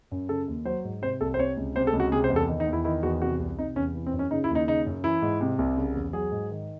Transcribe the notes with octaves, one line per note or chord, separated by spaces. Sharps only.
F#2
C#3 A4
D#2
F#3 C5
G#2
C3 C5
C2 A4
C5
C3 C#5
C#2
C3 C5
A4
C#2
F#4
C3 G#4
C5
E2
A4
D#3
D#4
E2
E4
D#3 E4
E2 F#4
C3 F#4
C2
C3 D#4
E2 C#4
E3
C4
F#2
C#4
C#3 D#4
E4
D#2
D#4
C#3 D#4
F#2
E3 E4
G#2
C3
C2
C#3
E2
F#3 G#4
G#2
D#3